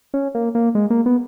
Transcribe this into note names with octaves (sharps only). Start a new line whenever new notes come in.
C#4
A#3
A#3
G#3
A#3
B3